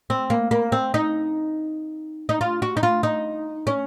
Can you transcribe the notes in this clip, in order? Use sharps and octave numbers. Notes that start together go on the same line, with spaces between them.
C4
A#3
A#3
C4
D#4
D#4
F4
F#4
D#4
F4
D#4
C#4